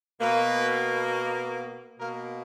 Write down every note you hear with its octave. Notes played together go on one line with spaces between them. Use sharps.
B2 A#3 B4
B2 A#3 A#4